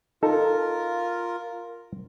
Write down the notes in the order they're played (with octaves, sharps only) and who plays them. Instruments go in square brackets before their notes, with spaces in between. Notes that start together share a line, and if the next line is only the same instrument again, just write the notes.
[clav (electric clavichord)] D#4 A4 [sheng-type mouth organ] F4 A#4